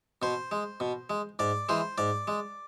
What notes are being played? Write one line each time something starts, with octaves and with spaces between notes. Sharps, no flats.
B2 C5
G#3
B2
G#3
G#2 D5
E3 G#3 C5
G#2 D5
G#3